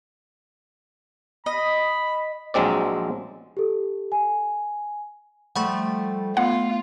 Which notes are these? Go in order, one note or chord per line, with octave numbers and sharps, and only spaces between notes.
D#5 B5
A#1 F#3 G#3 C4 D5
G4 A4
G#5
F3 G3 A3 F#5 B5 C#6
A3 B3 F4 F#5